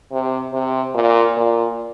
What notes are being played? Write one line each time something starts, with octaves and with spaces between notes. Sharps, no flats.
C3
C3
A#2
A#2